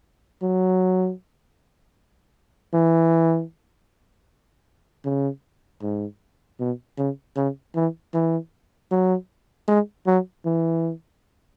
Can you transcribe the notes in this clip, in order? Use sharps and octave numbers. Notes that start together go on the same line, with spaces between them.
F#3
E3
C#3
G#2
B2
C#3
C#3
E3
E3
F#3
G#3
F#3
E3